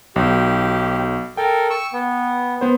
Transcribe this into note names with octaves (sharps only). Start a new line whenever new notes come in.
B1 G4
A4 A#4 G5
C#6 E6
B3
B3 C5